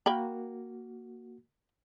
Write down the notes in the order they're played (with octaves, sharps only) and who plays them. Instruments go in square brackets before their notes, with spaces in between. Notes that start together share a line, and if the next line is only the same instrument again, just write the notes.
[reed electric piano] A#3 F#4 [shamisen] A#4 G5 B5